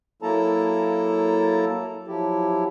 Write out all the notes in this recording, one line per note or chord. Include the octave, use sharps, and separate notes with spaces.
F#3 A#3 E4 A4 A5 A#5
F3 F#3 E4 G4